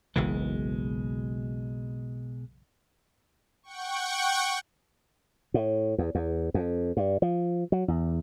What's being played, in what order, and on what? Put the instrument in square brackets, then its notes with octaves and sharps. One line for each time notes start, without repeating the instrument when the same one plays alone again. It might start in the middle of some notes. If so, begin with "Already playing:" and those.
[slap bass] F#1 B1 E3 [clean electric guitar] B2 G#3
[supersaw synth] F#5 G5 C#6
[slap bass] A2
E2
E2
F2
G2
F3
F#3
E2